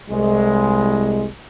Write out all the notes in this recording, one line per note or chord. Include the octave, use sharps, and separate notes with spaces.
C2 G#3